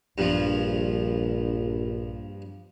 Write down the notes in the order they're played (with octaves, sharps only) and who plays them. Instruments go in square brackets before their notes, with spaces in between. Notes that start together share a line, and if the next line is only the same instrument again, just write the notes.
[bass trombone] A#1 [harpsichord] G2 F3